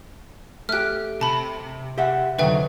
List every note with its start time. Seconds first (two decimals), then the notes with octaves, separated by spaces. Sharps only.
0.69 A3 G4 F6 F#6
1.21 C3 A5 B5
1.98 G4 E5 F#5
2.39 F2 D3 D#3 F#3 B4 E5 G5